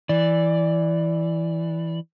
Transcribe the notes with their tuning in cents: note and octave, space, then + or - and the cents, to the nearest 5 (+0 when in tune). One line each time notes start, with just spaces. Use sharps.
E3 +0 D5 +0